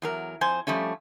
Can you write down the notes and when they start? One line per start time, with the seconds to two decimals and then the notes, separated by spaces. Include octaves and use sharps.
0.02 E2 F#3 A#4
0.41 F2 C5 G#5
0.67 F3 G3 A3 C#4